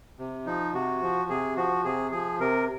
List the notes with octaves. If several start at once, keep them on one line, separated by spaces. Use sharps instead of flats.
C3
F3 D#4
C3 F#4
F3
C3 G#4
F3 F#4
C3 G#4
F3 G#4
C3 A#4